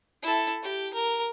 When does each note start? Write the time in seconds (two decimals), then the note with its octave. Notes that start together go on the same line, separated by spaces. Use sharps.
0.23 E4 A4
0.63 G4
0.94 A#4